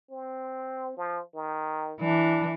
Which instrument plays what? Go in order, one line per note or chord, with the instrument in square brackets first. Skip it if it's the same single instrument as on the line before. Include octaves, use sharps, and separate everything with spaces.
[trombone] C4
F3
D#3
[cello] E3 [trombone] D4